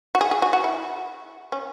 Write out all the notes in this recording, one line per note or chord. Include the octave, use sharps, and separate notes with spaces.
F#4
G#4
G#4
F#4
F#4
E4
C#4